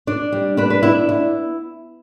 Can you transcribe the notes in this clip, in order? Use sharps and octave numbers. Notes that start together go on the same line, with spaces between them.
D4 D5
G3
D4 B4
B4
B3 E4
E4